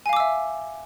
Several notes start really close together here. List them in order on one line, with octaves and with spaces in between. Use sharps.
G#5 F5 D6 E6 E5